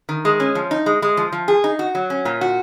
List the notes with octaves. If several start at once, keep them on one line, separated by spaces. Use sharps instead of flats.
D#3
G#3
C#4
F3
D#4
G#3
G#3
F3
F3
G#4
D#4
F#4
F#3
C#4
A#2
F#4